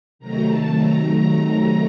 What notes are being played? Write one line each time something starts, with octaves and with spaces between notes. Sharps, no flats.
C3 D#3 F#3 A3 A#5
A5
A#5
A#5